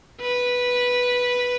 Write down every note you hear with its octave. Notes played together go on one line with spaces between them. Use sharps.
B4